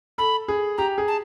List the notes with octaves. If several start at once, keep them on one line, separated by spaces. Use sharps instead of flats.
A4 B5
G#4
G4 A#5
G#4
A5